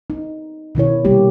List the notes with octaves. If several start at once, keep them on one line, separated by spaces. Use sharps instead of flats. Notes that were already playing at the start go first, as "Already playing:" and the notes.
D#4
B2 D#3 E4 C#5
C3 G3 A#3 G4